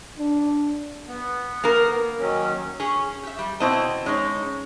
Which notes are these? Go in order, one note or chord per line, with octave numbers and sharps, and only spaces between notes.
D4
B3
A#3 A#4
D#3 F#3 C#4
C#4 G#4 C#5
G4 E5
G3
B2 C4 E4 D#5 A5
G#3 C#4 D#4